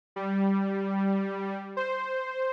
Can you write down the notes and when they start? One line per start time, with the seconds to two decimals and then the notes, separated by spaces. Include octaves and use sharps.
0.16 G3
1.77 C5